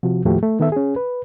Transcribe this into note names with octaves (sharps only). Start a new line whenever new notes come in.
C3 F3 F#4
D#2 A2 F3 A3 F#4 G4
A3
D#3 B3 A4 E5
C#4 G#4
B4